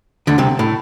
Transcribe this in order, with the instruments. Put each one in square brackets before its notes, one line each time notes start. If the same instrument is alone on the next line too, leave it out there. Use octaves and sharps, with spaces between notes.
[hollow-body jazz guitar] D2 D3
C2 C3
A2